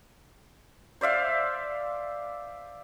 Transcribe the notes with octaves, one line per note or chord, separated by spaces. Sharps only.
C5 D5 E5 F5